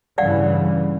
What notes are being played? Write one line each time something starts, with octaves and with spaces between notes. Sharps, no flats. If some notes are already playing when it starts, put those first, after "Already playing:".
G2 C#3 E3 D5 F5 F#5